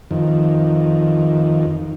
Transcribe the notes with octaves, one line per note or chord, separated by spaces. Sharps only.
F2 D#3